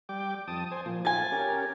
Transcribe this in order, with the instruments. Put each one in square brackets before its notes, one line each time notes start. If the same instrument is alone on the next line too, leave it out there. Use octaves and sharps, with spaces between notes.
[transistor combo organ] G3 G5 D6
F2 A5 D#6
C5 G#5
A#2 F3
[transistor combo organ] F4 [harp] G#5 A6
[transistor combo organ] C#4 G4 A#4